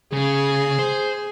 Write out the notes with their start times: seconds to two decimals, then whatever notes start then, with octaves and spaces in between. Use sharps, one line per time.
0.13 C#3 G#4
0.79 C5